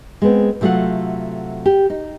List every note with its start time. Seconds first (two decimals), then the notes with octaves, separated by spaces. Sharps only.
0.22 G#3 B3 C4
0.61 C3 F#3 A3 C4 F4 F#5
1.66 G4
1.90 D#4